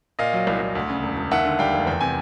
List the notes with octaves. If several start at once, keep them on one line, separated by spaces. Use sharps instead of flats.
A#2 D#5 F5
F#3
C2
C2
D2
C#3
E1
E1
D#2 E5 F#5
D3
G3 F5 G5
F1
E2 G5
C3 G#5